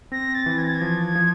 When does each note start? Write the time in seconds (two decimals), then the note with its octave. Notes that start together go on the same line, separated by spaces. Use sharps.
0.12 C4 A#6
0.35 A6
0.46 E3
0.58 G#6
0.66 A6
0.74 G#6
0.81 F3
1.16 F3